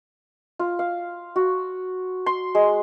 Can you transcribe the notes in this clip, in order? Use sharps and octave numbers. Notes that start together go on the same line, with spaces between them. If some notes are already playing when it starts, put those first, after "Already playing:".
F4
F5
F#4
C6
G#3